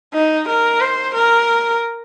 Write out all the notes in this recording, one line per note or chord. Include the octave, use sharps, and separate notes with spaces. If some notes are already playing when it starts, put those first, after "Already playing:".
D#4
A#4
C5
A#4